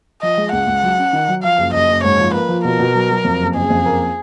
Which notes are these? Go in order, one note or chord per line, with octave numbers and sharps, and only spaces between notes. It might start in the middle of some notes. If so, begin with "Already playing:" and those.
F3 D#5
G#3
C#2 F#5
C#2
F#3
C#4
D#3
F#3
F3 F5
F#1
F#1 D#5
F#1
G#2 C#5
F3
A#3 B4
F3
B2 A#4
B2
F#3
F#3
F2
F#1
F#1 G#4
F2
A#3